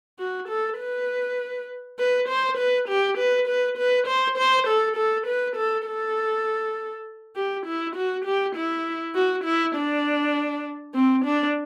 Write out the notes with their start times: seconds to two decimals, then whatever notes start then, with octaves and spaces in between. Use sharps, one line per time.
0.19 F#4
0.49 A4
0.78 B4
1.99 B4
2.29 C5
2.58 B4
2.89 G4
3.18 B4
3.48 B4
3.78 B4
4.07 C5
4.38 C5
4.68 A4
4.96 A4
5.27 B4
5.56 A4
5.86 A4
7.36 G4
7.66 E4
7.96 F#4
8.25 G4
8.55 E4
9.15 F#4
9.44 E4
9.75 D4
10.94 C4
11.25 D4